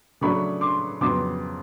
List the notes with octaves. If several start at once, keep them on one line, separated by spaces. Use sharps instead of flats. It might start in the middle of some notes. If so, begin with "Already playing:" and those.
C#3 F#3 A3 D4 B5 C#6
C6 D6
F2 C#3 F#3 B3 C6 D6